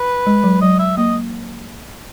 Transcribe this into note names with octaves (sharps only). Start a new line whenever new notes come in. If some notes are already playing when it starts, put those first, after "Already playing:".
Already playing: B4
G#3
F#3
F#3 D#5
E5
A#3 D#5